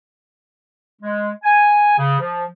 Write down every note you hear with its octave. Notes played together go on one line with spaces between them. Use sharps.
G#3
G#5
C#3
F3